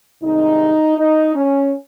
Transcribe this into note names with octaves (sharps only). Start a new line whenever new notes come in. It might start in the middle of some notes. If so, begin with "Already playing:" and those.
C2 C3 D#3 G#3 D#4
D#4
C#4